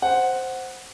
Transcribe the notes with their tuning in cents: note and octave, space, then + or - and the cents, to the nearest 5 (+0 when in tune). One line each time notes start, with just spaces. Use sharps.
C5 +0 F#5 +0